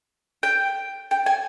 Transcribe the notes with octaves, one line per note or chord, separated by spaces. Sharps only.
G5
G5
G#5